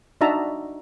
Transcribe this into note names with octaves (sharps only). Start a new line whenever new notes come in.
D4 D#4 F#4 E5 A5 A#5